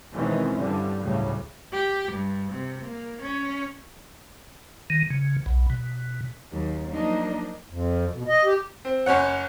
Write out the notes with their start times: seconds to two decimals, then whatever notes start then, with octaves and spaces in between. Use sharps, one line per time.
0.12 B2 D#3 E3 G#3 C4 C#4
0.59 G2 D3 G3
1.03 D2 A2 C#3 F#3 G3
1.72 G4
2.13 G2
2.53 C3
2.84 A#3
3.22 C#4
4.90 D#3
5.10 C#3
5.46 B1
5.70 B2
6.51 D#2 F#3
6.92 F3 F#3 A#3 D4 D#4 D#5
7.69 F2
8.13 B2
8.28 D#5
8.45 G4
8.85 C4
9.06 F#1 C#4 C#5 F#5